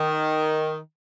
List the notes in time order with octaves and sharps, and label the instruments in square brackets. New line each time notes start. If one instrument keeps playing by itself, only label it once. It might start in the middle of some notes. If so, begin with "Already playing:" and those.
Already playing: [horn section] D#3